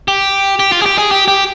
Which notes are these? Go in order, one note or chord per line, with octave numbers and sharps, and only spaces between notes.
G4
G4
F4
G#4
G4
G#4
G4
G4